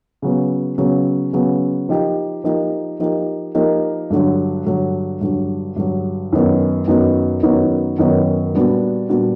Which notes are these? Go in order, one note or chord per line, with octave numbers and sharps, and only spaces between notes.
C#3 F#3 B3
C#3 F#3 B3
C#3 F#3 B3
F3 A#3 D#4 G4
F3 A#3 D#4 G4
F3 A#3 D#4 G4
F3 A#3 D#4 G4
G2 D3 F#3
G2 D3 F#3
G2 D3 F#3
G2 D3 F#3
F#2 D#3 F#3 B3 D#4
F#2 D#3 F#3 B3 D#4
F#2 D#3 F#3 B3 D#4
F#2 D#3 F#3 B3 D#4
A#2 G3 B3 D4 F#4
A#2 G3 B3 D4 F#4